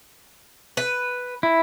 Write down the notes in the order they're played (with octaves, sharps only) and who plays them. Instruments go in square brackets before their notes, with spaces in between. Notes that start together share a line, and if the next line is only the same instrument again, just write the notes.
[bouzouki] B4
[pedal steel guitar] E4